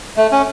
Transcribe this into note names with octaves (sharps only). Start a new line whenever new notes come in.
A3
C#4